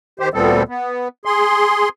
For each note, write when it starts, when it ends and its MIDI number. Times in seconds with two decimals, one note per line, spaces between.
0.20 0.29 51
0.20 0.29 67
0.20 0.29 72
0.34 0.63 38
0.34 0.63 46
0.34 0.63 55
0.34 0.63 59
0.34 0.63 60
0.34 0.63 69
0.68 1.08 59
1.25 1.89 68
1.25 1.89 84